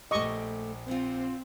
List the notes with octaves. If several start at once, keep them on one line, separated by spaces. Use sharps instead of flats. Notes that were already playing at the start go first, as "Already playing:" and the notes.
A#1 A3 G4 D#5 C#6 D6
C4 F4 F5 F#5